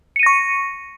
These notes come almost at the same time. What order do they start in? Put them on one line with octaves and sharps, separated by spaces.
C#7 D#7 A#6 C#6